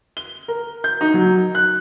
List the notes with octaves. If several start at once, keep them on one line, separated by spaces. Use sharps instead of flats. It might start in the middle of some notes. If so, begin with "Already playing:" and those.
G7
A#4
G6
D#4
F#3
F#6